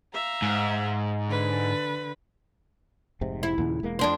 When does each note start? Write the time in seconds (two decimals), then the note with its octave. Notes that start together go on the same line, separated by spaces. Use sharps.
0.13 E5 F5 A#5
0.42 G#2
1.28 D3 B4
3.21 F1 G#2 C3
3.43 E4
3.58 D#2 A#2 C#3
3.83 E1 G#3 A#3
3.99 F2 D4 C5